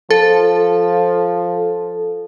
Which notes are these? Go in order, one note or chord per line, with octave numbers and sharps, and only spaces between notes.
F3 A4